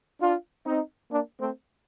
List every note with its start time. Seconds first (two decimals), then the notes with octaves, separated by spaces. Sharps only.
0.21 D4 F4
0.66 C4 D#4
1.11 A#3 D4
1.40 A3 C4